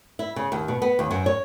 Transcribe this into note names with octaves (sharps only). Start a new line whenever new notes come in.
E4
C#3
D#2
B2
B3
D#2
F#2
C#5